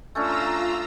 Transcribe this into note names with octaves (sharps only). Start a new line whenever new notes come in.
A3 C#4 D4 F4 A#5 E6